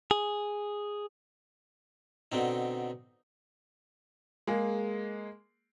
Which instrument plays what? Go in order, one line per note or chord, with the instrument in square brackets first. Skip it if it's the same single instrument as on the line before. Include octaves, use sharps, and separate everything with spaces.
[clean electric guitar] G#4
[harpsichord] B2 D3 C4 D#4
[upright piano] G#3 A#3 G#4